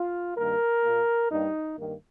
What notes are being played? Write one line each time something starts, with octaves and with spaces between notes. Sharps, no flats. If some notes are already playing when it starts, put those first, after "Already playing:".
Already playing: F4
G2 D#3 A#3 A#4
A#2 A#3
G2 G3 A#3 D#4
G2 D#3 A#3